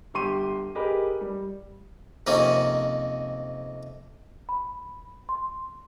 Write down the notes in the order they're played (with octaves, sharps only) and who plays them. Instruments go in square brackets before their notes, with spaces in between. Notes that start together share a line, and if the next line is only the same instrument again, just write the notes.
[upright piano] G1 G4 C6 D#7
G4 G#4 A#4 B4 D#5
G3
[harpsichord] F2 C3 D#3 A#3 C#4
[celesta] B5
C6